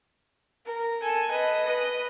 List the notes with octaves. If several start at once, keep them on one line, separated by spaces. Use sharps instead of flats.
A#4
A4 G#5
B4 D#5
B4 D#5